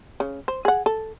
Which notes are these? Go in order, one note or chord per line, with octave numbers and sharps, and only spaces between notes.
C#3
C5
G#4 F#5
A4